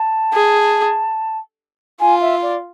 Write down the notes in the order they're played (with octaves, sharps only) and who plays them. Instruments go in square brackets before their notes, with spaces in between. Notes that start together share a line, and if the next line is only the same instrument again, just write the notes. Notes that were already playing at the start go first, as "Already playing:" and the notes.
Already playing: [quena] A5
[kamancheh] G#4
[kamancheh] F4 [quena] G#5
[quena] E5
D5